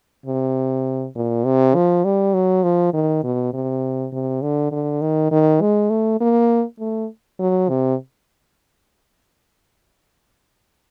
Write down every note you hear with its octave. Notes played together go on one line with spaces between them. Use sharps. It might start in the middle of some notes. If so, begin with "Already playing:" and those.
C3
A#2
C3
F3
G3
F#3
F3
D#3
B2
C3
C3
D3
D3
D#3
D#3
G#3
A3
A#3
A3
F#3
C3